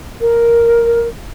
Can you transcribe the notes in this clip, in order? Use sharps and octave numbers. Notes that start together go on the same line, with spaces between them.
A#4